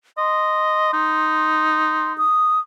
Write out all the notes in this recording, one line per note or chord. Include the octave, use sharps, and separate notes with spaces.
D#5 C6
D#4
D#6